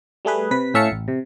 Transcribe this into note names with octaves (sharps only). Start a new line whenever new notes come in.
G3 A3 G#4 B4
C3 B4 B6
A2 C#4 E5 F5 A5 C#7
A1
C3